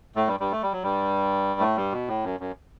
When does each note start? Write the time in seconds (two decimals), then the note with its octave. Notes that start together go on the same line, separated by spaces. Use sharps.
0.16 A2 A3
0.27 G2 G3
0.40 G2 G3
0.52 A3
0.62 G3
0.73 F#3
0.83 G2 G3
1.60 A2 A3
1.76 G2 G3
1.92 B2
2.08 A2
2.24 F#2
2.40 F#2